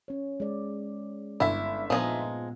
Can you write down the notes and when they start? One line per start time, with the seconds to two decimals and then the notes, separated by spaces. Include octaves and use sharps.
0.08 C#4 C#5
0.40 G#3 D5
1.40 G1 E4 E5
1.90 A#2 F3 G#3 B3 D#4